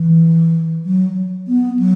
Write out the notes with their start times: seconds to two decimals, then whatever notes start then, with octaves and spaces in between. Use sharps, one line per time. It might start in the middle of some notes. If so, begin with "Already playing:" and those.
Already playing: E3
0.85 F#3
1.48 B3
1.79 F#3